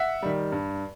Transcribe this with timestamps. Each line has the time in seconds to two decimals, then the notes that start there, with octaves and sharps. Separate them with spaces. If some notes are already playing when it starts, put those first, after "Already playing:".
Already playing: E5 F#5
0.22 D#3 G3
0.52 G2